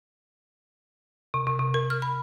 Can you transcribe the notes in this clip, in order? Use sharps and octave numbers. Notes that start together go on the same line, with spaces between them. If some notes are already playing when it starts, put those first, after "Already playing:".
C3
C3
C3
A#4
F6
B5